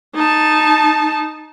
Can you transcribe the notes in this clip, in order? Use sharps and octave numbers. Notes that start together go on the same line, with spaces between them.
D#4 A5